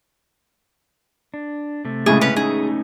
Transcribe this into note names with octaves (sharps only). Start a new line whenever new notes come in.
D4
C3 A3
A2 C#3 G#3 G#4
C#4 B4
A3 C#4 D#4 G#4